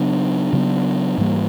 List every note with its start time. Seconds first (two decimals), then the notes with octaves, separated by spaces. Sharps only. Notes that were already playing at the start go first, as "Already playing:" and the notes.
Already playing: C#3 F#3 B3 D4
0.53 C#3 F#3 B3 D4
1.18 G#2 E3 G3 A#3